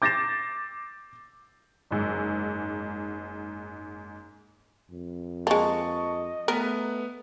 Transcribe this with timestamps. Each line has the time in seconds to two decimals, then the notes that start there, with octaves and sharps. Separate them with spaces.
0.02 D6 G6 A6 A#6 C7 E7
1.91 F#1 G#2 E6
4.90 F2
5.47 G#3 A#3 D#5 A5 C#6
6.48 A3 B3 A#4 B4